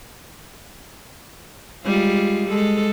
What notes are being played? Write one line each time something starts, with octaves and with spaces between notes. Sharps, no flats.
G3 G#3 F4
G#3 A4